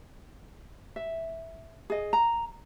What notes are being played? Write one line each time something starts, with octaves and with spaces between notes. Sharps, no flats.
E5
G#4 D#5
A#5